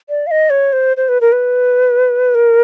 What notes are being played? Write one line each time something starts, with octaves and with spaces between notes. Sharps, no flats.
D5
F5
D#5
C#5
C5
C5
B4
A#4
B4
A#4